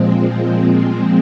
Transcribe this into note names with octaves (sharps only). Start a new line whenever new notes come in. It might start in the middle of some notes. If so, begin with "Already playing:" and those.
Already playing: A#2 F3 G#3 C4